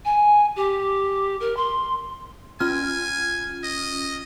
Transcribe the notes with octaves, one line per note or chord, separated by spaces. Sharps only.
G#5
G4
A#4
C6
C#4 F4 G#5 F6
D#5